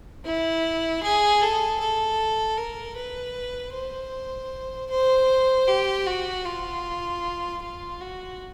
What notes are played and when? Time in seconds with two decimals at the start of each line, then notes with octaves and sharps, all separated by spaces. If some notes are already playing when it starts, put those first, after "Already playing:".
0.25 E4
1.03 G#4
1.42 A4
1.80 A4
2.57 A#4
2.96 B4
3.74 C5
4.90 C5
5.67 G4
6.07 F#4
6.46 F4
7.62 F4
8.01 F#4